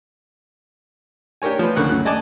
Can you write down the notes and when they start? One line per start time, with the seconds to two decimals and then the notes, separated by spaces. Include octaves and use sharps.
1.42 D4 G4 A#4 C#5 G#5
1.59 F3 B4
1.76 C#2 D3 D#3 A#4 C#6 F#6
1.89 F#2 F#6
2.05 D5 D#5 G#5 A5 D6